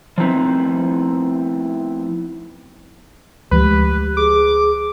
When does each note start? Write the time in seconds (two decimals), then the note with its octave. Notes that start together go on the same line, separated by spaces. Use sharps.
0.18 F3 A3 B3 C4 D#4 E4
3.51 D2 F3 G#3 G4 B4
4.17 G#4 D6